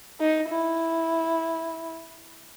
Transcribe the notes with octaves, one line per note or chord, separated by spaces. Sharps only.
D#4
E4